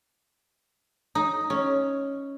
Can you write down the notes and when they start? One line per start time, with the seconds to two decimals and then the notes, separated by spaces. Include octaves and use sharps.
1.15 D#4
1.50 C#4